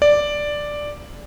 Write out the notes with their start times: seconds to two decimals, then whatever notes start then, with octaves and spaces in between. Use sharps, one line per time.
0.02 D5